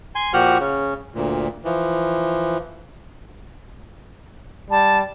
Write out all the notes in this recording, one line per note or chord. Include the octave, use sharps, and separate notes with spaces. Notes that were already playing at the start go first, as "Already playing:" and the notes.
G#5 C6
A#2 F3 F#4 G4 F#5 F6
C#3 C#4
D2 A#2
E3 F3
G3 A5